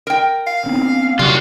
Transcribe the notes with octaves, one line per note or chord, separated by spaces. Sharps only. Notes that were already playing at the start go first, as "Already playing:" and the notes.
A#4 G5
F5
B3 C4 D4
C#3 F#3 G3 F4 F#4